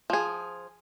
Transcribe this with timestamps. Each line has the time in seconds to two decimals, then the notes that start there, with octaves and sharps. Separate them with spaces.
0.10 F3 G#4